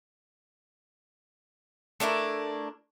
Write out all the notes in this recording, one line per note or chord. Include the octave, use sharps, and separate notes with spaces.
A3 D4 E4 A#4